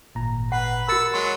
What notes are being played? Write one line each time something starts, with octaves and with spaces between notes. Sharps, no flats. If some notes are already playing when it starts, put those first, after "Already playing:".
G#1 A#2 A#5
B4 F#5
F#4 A#4 B5 E6 A6 C#7
F#3 G#3 C6